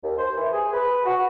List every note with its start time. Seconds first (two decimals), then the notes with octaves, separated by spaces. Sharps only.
0.03 D#2
0.17 C5
0.36 E3
0.52 G#4
0.73 B4
1.05 F#4